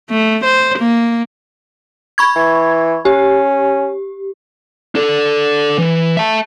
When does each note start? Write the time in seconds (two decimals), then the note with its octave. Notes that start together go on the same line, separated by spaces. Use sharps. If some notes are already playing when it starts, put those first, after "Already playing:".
0.10 A3
0.45 C5
0.79 A#3
2.18 B5 C#6 G#6
2.36 E3
3.05 C#4 G4
4.95 D4 A4
5.78 E3
6.17 E5 A5